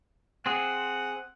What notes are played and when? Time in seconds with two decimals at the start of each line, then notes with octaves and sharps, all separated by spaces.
0.46 C4 G#4 F#5